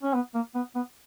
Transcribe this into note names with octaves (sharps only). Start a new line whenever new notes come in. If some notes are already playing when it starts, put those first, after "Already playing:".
C#4
B3
A#3
B3
B3